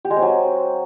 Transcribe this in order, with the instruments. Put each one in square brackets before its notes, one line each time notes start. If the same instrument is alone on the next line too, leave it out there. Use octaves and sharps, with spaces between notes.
[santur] G4
G#3
C4
F#3